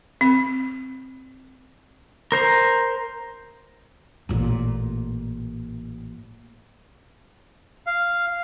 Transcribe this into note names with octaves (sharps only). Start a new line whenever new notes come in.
C4
A#4 C5 A#5
A1 A#2
F5